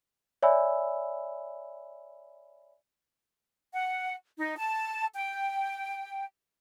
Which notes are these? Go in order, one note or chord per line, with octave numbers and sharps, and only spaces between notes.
C#5 D5 E5 G#5 B5 E6
F#5
D#4
A5
G5